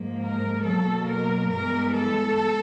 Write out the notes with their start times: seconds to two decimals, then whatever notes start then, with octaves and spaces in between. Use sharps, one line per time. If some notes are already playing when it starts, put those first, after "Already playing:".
Already playing: G#2 F3 A#3
0.24 A#4
0.67 B2 F#3 A#3 A4
1.09 A#4
1.52 G2 E3 G#3 B3 A#4
1.95 A4